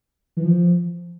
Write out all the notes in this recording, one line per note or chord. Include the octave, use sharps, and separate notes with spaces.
E3
F3